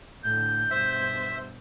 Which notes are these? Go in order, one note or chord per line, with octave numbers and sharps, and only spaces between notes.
A2 D3 G6
G2 B2 C5 E5